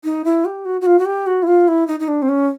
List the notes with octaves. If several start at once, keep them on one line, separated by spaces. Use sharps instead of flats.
D#4
E4
G4
F#4
F#4
F4
F#4
G4
F#4
E4
F4
E4
D#4
D#4
D4
C4
C#4